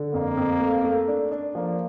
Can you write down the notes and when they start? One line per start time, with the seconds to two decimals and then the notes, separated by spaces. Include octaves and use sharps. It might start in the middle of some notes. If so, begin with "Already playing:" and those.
Already playing: D3
0.13 F2 A#3
0.37 F2
0.60 A3
0.84 A3
1.08 D4
1.31 D4
1.55 F3 A#3